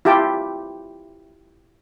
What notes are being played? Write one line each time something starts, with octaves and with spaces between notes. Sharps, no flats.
E4 F4 G4 G5 A5